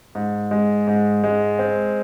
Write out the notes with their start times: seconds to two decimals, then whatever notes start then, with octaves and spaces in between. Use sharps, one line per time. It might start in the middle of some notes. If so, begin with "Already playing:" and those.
0.15 G#2
0.51 G#3
0.87 G#2
1.24 G#3
1.59 C4